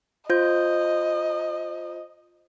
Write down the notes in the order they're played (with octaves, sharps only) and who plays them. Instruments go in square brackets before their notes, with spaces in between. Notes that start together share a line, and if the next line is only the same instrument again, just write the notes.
[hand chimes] F4 C5 G6 [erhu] D#5